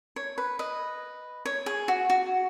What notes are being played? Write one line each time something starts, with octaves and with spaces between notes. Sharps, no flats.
C#5
B4
B4 D#5
C#5
G#4
F#4
F#4